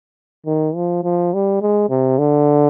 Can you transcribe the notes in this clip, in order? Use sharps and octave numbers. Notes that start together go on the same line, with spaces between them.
D#3
F3
F3
G3
G#3
C3
D3